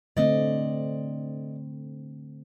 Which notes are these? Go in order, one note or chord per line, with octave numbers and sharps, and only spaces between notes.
D3 A3 C4 D5 D#5